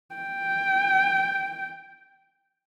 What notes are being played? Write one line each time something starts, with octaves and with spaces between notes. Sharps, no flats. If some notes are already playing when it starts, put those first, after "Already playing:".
G5